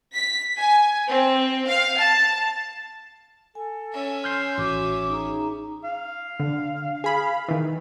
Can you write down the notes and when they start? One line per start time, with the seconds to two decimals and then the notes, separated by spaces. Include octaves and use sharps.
0.15 B6
0.59 G#5
1.08 C4
1.67 F5
1.98 A5
3.55 A4 G#5
3.93 C#4 E5
4.24 C6 F6 G6 C7
4.58 A1 F#4 D6
5.10 D#4 G#4 A#5
5.84 F5
6.40 D3
7.04 G#4 B5
7.48 D#3 E3